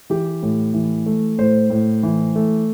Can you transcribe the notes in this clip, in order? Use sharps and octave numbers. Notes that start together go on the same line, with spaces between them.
E3 G4
A2
E3
A3
A2 C5
A2
E3
A3